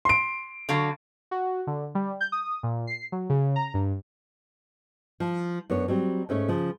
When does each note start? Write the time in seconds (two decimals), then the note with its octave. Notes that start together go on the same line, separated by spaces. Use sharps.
0.05 C6 D7
0.69 D3 F#3 F5
1.31 F#4
1.67 D3
1.95 G3
2.21 G6
2.32 D#6
2.63 A#2
2.87 C7
3.12 F#3
3.30 C#3
3.56 A#5
3.74 G2
5.20 F3
5.70 F#2 B3 D4 C#5
5.88 F#3 G3 C4
6.29 G#2 A3 C#4 C#5
6.48 C#3 F3